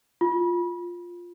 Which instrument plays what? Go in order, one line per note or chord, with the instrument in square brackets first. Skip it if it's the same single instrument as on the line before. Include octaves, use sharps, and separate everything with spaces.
[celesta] F4